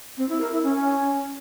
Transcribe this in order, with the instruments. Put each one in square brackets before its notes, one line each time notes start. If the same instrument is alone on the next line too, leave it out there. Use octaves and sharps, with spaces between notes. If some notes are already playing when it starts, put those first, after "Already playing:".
[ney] C4
E4
A#4
E4
C#4